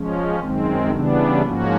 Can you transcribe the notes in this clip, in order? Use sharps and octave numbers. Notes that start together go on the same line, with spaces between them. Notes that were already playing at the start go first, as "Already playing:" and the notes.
Already playing: F3 G#3 C#4
F#2 D#3 G#3 C4
C#3 E3 G3 B3 D4
G#2 F3 A#3 C#4 F#4